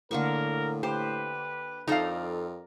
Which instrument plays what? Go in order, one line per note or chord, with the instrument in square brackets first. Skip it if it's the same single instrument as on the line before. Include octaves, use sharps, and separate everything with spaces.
[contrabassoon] A2 [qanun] D3 A#3 C#6 [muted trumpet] A#4
[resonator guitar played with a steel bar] G4 [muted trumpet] B4 [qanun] C5
[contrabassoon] F2 [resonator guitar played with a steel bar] D#4 A4 F5 [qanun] A#4 D5 A#5